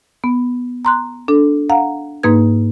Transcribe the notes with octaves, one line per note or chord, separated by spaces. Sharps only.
B3
A#5 C6 F#6
D4 A4
F5 F#5 A#5
G#2 A#3 D#4 B4 G#6